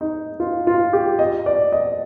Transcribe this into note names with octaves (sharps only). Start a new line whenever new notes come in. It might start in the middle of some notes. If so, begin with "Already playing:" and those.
D#4
F4
F4
G4
D#5
D5
D#5